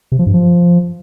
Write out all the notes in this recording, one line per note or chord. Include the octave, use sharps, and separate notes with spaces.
C3
F3
G2
F3